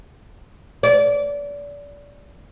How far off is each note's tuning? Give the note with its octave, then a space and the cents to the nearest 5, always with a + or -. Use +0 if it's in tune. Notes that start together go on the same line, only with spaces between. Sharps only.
D5 -30